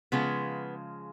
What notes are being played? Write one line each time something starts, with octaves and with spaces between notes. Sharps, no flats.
C#3 F3 G#3 B3